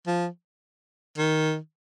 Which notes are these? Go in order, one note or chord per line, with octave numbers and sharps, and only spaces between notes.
F3
D#3